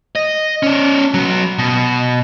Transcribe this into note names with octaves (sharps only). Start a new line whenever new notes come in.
D#5
C#4 D5
F#3 B3
B2